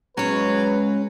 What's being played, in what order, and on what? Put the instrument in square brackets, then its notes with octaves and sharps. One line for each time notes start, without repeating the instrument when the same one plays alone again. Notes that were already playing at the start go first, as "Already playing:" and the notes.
[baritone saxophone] F#3 [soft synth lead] G#3 [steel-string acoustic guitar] C#4 C#5 [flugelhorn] B4